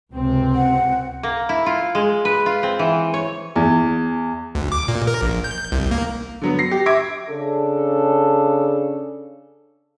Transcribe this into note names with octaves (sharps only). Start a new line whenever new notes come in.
C#2 C3 C4
F#5
A#3
E4
F4
G#3
B4
F4
C4
E3
C#5
E2
D2
D6
A#2
A#4
A#1
G6
C2
A#3
D3 F#3 B3
A#6 C7
G4
E5 D6 G#6 A#6 D7
C#3 D4 A4